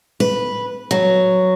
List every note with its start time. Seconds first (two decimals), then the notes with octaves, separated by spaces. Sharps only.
0.20 B4
0.91 F#3